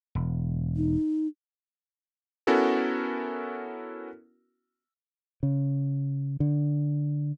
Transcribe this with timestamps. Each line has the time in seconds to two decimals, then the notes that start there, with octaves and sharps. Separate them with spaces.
0.15 E1
0.76 D#4
2.47 B3 C#4 E4 F#4 A4 A#4
5.43 C#3
6.40 D3